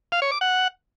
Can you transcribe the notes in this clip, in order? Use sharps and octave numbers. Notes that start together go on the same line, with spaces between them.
F5
C#5
D6
F#5